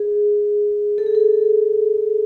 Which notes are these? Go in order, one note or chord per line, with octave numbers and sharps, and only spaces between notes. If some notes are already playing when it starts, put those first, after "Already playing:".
Already playing: G#4
A4
G#4
A4